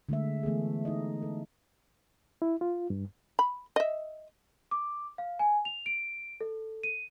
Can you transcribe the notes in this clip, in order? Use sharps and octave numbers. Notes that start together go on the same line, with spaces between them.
D3 G#3 A3 E5
E3 A3 B3 G#4
D#4 E4 D#5
A4
E4
F4
G2
B5
D#5 E5
D6
F5
G#5
F7
D7
A4
D#7